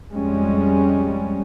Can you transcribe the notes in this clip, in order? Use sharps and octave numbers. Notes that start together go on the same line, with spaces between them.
F2 G3 G#3 C#4